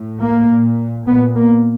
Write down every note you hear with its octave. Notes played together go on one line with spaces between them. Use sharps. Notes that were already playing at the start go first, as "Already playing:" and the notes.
Already playing: A2
A#3
A#2
A#2 B3
A#3